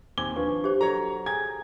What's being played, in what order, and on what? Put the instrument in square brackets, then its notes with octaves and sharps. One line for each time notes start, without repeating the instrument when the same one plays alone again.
[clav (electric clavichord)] D#2 C4 G#5 [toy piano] D6 [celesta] G#6 [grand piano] G7
[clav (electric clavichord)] F3 [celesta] D4 B4 C#6
[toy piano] G4 C5
[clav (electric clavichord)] F#3 [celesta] A4 [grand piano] C#5 A#5
[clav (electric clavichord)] G#4 G5 A#5 [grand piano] G#6